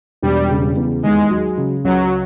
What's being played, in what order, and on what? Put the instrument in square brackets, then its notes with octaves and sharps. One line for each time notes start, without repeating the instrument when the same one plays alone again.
[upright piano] E1 [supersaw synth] G3
[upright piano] C#3
E2
[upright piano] D#2 [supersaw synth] G#3
[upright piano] F#3
C#3
[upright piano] C#2 [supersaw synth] F#3